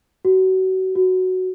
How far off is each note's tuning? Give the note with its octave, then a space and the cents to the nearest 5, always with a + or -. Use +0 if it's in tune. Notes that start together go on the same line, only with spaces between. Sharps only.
F#4 +30
F#4 +5